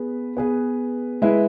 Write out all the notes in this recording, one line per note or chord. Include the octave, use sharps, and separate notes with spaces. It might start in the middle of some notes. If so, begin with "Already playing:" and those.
Already playing: B3 G#4 B4
B3 G#4 B4
G#3 E4 B4